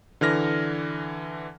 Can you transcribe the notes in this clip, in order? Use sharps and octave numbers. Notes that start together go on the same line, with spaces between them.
D3 E3 F6 A#6